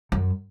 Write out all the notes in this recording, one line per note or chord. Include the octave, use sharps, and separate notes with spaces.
F#2